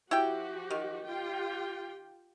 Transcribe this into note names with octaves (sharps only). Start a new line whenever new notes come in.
F3 E4 F#4 G4 G5
D#3
F4 G4 G5